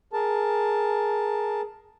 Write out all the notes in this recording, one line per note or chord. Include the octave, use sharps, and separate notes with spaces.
G#4 A#4 A5